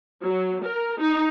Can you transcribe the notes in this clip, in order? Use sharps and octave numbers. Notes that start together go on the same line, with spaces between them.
F#3
A#4
D#4